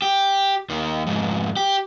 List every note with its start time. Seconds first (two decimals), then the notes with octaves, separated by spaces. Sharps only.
0.02 G4
0.70 D#2 D#3
1.07 F2 G#2
1.57 G4